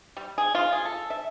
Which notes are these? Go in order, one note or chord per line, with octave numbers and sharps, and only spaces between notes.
G3
G#4
F4
G#4
A4
E5